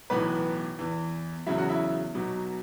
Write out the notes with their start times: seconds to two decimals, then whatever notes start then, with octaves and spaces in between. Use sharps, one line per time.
0.10 B1 A2 E3 B3 B4
0.79 E2 E3
1.46 E2 C#3 F#3 E4 E5
1.58 F#4 F#5
1.69 E4 E5
2.15 B1 B2 F#3